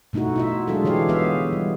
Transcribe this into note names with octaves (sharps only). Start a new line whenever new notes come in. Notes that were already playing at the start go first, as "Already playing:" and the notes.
B2 A3 D#4 E4 F#4
E4 F4 E5
F#3 G#3 D4 F4 G#4 A4
D3 E3 G4 C#5 F5
G#3 B3 G#4 E5 F5
G3